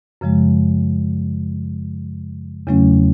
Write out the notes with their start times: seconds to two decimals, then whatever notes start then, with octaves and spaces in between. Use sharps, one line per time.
0.21 F#2 C#3 F3 G#3
2.67 E2 C#3 F#3 A3 C#4